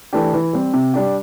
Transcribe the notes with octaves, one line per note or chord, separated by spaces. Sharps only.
E3 A3 D4 G4
E3
G3 C4
C3
G3 D4 G4